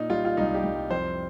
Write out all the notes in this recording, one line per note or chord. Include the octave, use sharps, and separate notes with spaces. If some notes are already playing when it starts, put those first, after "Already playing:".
Already playing: A#2 D#4
G3 F4
F4
C2 D#4
G4
C2
F2 C5